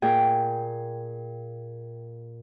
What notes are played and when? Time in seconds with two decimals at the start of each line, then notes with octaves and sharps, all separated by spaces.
0.02 A#2 G#4 G5